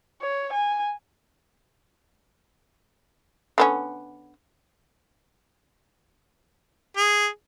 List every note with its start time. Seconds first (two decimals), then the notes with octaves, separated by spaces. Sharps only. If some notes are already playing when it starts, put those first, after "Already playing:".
0.21 C#5
0.53 G#5
3.58 D3 B3 C#4
6.97 G#4